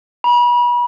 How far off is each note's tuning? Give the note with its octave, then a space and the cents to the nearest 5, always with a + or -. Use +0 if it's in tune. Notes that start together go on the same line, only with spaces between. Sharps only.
B5 -35